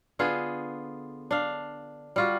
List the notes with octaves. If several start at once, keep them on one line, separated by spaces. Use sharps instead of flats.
D3 B3 F4 G#4
D4 F5
G3 F4 F#4